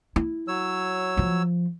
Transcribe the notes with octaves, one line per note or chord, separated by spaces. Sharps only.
E4
F#3 C#5 E6
F3 F4